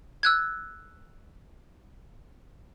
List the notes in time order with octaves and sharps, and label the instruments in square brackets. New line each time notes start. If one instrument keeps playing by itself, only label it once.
[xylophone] E6 F#6 G#6